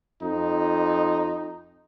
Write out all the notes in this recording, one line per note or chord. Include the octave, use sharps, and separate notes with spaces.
F2 D#4